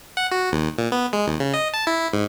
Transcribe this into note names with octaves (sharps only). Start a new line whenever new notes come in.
F#5
F#4
D#2
A#2
B3
G#3
D#2
C#3
D#5
A5
E4
G#2